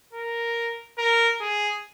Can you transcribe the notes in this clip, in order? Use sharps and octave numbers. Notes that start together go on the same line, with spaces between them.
A#4
A#4
G#4